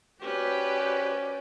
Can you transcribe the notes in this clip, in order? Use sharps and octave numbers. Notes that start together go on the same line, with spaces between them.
C#4 F#4 G4 B4 C5 D5